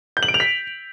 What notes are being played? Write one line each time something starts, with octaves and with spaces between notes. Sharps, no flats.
G6
F#7
D7
F7
B6